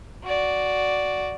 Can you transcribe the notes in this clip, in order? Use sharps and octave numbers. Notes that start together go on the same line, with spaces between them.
F#4 D5